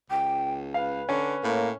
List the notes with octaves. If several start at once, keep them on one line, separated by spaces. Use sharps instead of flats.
C#2 G5
B4 F5
D3 C#4
A2 A#3